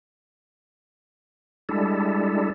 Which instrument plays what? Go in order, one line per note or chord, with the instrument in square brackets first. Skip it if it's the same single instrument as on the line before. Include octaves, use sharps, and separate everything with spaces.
[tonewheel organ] G3 G#3 D4 E4 A4